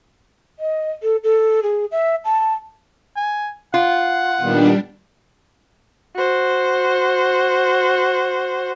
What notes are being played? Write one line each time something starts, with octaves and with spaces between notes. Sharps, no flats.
D#5
A4
A4
G#4
E5
A5
G#5
F4 F#5
A#2 D#3 G3 B3 D4
F#4 C5